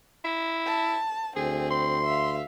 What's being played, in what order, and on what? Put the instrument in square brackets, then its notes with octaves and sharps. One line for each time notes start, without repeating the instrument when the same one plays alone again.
[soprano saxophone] E4
[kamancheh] A5
[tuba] D2 [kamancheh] C4 [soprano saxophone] G#4
[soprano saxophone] C6
[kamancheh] E5 F5